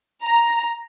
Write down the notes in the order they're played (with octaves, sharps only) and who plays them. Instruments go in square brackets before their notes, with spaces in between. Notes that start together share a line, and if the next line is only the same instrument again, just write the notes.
[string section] A#5